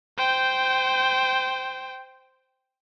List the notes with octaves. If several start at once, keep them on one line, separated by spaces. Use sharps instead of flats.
C5 G5